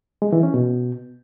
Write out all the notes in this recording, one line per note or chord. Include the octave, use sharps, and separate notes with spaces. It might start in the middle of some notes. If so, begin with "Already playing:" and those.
G#3
E3
C#4
B2